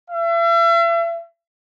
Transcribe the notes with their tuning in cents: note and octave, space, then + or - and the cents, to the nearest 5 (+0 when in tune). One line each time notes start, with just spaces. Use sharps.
E5 +40